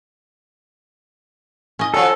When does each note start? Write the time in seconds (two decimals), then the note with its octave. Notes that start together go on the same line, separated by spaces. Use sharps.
1.79 C#4 D#5
1.94 D#3 F3 F#3 A4